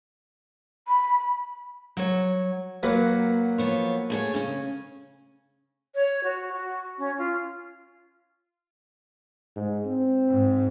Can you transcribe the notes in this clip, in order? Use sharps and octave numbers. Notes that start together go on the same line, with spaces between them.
B5
F#3 C#5
F#3 A#3 B4 F#5
F3 B3 C#5
A3 G#4 C#5
C#3 C#4
C#5
F#4
F#4
C#4
F4
G#2
C4
G#2